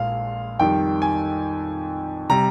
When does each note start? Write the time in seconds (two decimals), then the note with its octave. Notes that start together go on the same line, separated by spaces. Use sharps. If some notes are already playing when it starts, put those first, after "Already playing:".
Already playing: A#1 A#2 G#3 F5
0.59 F2 D#3 G3 G5
1.02 G#5
2.29 C3 G3 A#5